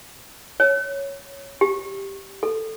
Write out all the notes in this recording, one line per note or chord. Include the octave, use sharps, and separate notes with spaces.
C#5
G4
A4